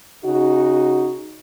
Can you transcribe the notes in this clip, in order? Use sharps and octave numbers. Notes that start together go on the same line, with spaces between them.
C#3 D#4 F#4